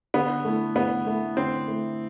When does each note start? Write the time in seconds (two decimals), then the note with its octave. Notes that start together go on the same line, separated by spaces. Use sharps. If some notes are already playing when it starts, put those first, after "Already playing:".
0.14 D3 B3
0.44 A3 E4
0.76 D3 B3
1.06 A3 E4
1.37 D3 C4
1.67 A3 E4